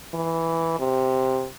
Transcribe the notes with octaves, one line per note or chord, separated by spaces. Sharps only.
E3
C3